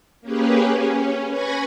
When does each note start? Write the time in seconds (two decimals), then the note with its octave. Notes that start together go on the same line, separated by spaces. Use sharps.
0.21 A#3 C#4 G4 G#4 B4
0.72 C#4
1.31 B4 G#5 B5 C#6 G#6 A#6